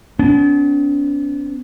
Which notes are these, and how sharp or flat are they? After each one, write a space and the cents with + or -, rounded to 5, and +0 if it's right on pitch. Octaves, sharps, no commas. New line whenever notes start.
B3 +45 D4 -45